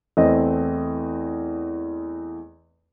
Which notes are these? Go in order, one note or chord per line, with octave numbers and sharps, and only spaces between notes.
E2 A3 C4 D#5